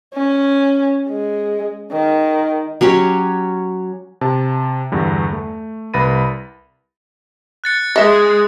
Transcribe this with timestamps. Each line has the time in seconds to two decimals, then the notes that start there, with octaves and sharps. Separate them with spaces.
0.15 C#4
1.09 G#3
1.92 D#3
2.81 F#3 C#4 G4 C#5
4.21 C3 A5
4.92 E2 G2 D3
5.33 A3
5.94 C2 B4 B5 A6 A#6 D#7
7.64 F#6 A6 C#7
7.96 G#3 G#4 D#5 E5